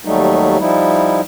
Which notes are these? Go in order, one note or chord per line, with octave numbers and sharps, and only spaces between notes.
D#2 F#3 G3 A3 D#4
F3 G3 D#4 E4